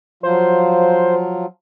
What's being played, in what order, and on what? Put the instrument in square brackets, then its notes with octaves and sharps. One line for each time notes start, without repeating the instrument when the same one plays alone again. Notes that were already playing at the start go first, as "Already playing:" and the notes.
[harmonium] F3 F#3 F4 [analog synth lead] C5